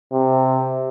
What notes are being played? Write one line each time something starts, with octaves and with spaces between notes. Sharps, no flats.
C3